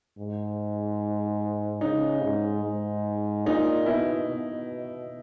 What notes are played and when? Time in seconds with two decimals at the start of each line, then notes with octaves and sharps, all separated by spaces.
0.18 G#2
1.81 C#3 D#4
2.23 G#2
2.63 G#2
3.46 A#2 D#4
3.86 B2 E4
4.28 B2